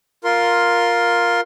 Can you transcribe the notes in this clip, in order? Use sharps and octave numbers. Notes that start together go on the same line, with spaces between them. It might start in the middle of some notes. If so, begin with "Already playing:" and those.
F4 A#4 C6